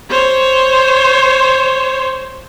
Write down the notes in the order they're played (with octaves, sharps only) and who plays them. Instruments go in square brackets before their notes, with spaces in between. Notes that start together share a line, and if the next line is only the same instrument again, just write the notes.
[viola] C5 C#5